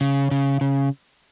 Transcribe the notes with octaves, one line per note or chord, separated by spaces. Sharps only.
C#3
C#3
C#3